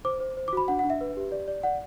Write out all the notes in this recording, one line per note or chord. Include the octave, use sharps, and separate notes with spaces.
C5 D6
C5
C5
D6
F#4 B5
D4 F#5
F#5
D4
E5
B4
G4
D5
D5
D5 F#5